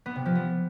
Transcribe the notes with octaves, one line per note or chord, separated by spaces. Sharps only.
B3
C3
F3
B3